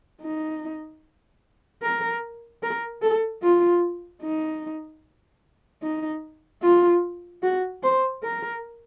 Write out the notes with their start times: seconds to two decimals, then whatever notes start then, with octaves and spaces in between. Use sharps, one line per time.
0.22 D#4
1.82 A#4
2.63 A#4
3.02 A4
3.43 F4
4.22 D#4
5.83 D#4
6.63 F4
7.43 F#4
7.83 C5
8.23 A#4